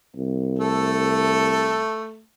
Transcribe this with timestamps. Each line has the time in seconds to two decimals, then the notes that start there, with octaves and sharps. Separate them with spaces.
0.16 C2
0.59 A3 A4